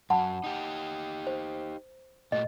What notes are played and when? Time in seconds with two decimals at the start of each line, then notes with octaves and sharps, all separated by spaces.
0.10 F#2 F#3 F#5 A5 B5
0.44 D#4 G4
1.27 C5
2.32 A#2 A3 F#4 D#5